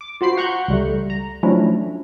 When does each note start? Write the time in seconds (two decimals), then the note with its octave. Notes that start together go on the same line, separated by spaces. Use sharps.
0.01 D6
0.21 F4 F#4 C5 B5 C7
0.37 F#5 A#5 C#6 F#6 G6
0.68 C#2 G3 A3
1.10 A#5
1.43 F3 F#3 A3 C#4 D4 E4